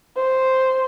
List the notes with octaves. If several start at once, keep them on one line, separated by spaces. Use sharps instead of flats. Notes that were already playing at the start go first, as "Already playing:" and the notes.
C5